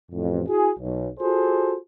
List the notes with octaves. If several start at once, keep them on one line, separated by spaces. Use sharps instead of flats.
A1 F2
E4 F#4 G#4
B1
F4 F#4 G#4 A4 C5